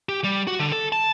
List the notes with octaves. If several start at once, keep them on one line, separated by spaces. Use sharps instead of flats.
G4
G3
F#4
D3
A4
A5